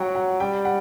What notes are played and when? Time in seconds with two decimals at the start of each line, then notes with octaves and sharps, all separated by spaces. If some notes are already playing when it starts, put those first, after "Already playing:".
Already playing: F#3 F#5 G5
0.15 F#5
0.40 G3 G5
0.65 F#5